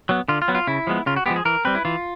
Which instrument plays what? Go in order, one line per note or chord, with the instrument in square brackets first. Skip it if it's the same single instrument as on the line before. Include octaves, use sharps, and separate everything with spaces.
[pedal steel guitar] F#3 B3
D3 F4
F4
F#3 B3
F4
C#3 E4
F3 G#3 B3
C#3 F4
F#4
F3 G#3 B3 G4
G#4
E3 A#4
G3 C4 B4
E4
E3 F4